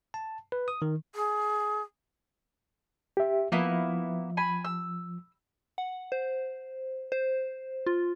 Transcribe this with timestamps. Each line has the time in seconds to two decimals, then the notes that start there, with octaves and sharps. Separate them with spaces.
0.14 A5
0.52 B4
0.68 D#6
0.82 D#3
1.15 G#4
3.17 G4 E5
3.52 F3 A#3 B3 E4
4.37 G#5 B5
4.65 E6
5.78 F#5
6.12 C5
7.12 C5
7.86 F4